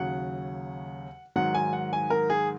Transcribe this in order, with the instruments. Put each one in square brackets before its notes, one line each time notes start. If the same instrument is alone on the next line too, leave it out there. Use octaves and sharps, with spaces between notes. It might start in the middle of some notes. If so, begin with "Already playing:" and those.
Already playing: [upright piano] D#2 C#3 F#3 F#5
G#2 D#3 F#3 F#5
G#5
F#5
G#5
A#4
G#4